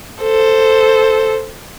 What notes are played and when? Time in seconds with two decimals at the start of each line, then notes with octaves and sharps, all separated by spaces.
0.21 A4 C5